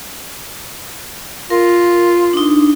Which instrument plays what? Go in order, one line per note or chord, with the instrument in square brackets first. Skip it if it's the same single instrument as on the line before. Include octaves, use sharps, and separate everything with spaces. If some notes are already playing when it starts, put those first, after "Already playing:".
[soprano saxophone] F4 [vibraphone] A#4
[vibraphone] D4 D#4